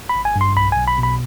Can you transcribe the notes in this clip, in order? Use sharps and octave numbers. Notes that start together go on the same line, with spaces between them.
B5
G#1
G#5
G2
C6
B1 B5
B1 G#5
B5
B2
B5